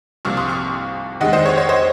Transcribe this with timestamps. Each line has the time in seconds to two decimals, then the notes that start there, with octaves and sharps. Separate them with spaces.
0.25 C2 C3 F3 A#3 C#6 F6
0.37 C6 D#6
0.49 C#6 F6
1.21 F1 D#2 D#3 G#3 D#5 F#5
1.33 C5 D#5
1.46 C#5
1.58 C#5
1.69 C5 D#5